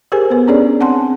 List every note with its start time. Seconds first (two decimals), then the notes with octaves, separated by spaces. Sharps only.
0.12 G4 G#4 A#4 C5 G#5
0.30 B3 B4
0.47 C#4 D4 G#4 C#5 D5
0.80 C4 F#5 G#5 A5 C6